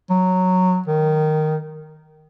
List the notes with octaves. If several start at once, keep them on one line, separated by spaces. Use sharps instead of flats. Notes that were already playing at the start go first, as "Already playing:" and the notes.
F#3
D#3